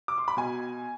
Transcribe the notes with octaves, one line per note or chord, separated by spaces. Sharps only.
D6
C6
B5
B2 G#5